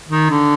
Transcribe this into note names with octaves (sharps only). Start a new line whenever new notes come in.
D#3
D3